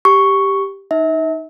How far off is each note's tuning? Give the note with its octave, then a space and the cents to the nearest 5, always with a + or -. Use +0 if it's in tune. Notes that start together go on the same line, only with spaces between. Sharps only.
G4 +0 C#6 +0
D#4 +0 E5 -40